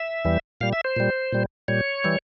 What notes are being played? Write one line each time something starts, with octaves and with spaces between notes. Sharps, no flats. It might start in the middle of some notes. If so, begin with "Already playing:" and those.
Already playing: E5
E2 E3 G3
A#2 G3 F5
E5
C5
A#2 G3
A#2 G3
A#2 G3 C#5
E3 G3